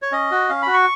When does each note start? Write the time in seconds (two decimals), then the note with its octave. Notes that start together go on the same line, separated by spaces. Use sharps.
0.02 C#5
0.12 C#4 D#5
0.31 F#4
0.49 C#4 F5
0.62 F#4 B5
0.74 C#6